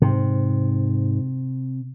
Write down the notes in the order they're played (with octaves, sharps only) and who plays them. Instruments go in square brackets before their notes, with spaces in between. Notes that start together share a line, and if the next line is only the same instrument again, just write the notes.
[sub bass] G#2 [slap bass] C3